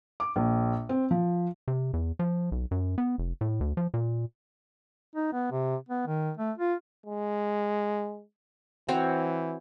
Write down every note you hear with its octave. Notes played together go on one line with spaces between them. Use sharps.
D6
A#1
C4
F3
C3
E2
F3
B1
F#2
B3
F1
A2
D2
F3
A#2
D#4
B3
C3
B3
D#3
A3
F4
G#3
E3 C4 F#4 C#5